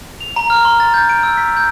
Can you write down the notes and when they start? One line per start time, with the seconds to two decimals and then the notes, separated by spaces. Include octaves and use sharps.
0.21 F7
0.36 A#5
0.50 F6
0.65 C6
0.80 A6
0.94 G6
1.09 D7
1.23 E6
1.37 B6
1.57 G6